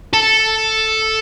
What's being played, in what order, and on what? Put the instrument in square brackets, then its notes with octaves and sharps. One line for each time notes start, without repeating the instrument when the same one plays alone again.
[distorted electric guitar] A4